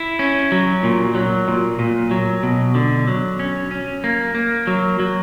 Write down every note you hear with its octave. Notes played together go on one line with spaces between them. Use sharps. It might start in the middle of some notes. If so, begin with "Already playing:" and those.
Already playing: E4
C#4
F#3
A#2
F#3
A#2
A#2
F#3
B2
D3
F#3
C#4
C#4
A#3
A#3
F#3
F#3